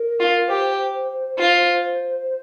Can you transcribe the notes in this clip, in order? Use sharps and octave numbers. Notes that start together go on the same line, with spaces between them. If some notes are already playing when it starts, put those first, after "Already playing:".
Already playing: A#4
F4
G4 C5
F4